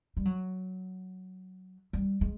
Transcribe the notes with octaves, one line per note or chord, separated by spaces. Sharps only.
G3
F#3
G3
G#3